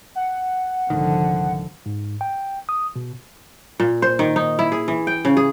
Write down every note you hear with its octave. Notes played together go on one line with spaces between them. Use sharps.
F#5
C2 G#2 D3 D#3 F3
G#2
G5
D#6
B2
A#2
C5
D#3
D#4
E4
G#4
E3
G5
C#3
G#4